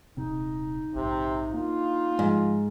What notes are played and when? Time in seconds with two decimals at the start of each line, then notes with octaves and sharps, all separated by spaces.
0.17 D#1 C3 C4 D#4
0.95 A#1 G#2 C3
1.54 A#3 D4 F4
2.19 G#2 F3 G#3